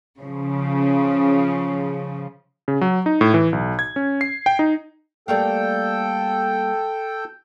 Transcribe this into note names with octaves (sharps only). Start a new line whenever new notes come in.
C#3 F3
C#3
F#3
D#4
A2
E3
B1
G#6
C#4
C7
G5
D#4
G3 A3 A#3 A4 G5